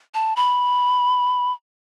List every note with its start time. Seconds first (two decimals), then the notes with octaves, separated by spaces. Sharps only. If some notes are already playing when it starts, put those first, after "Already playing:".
0.14 A5
0.36 B5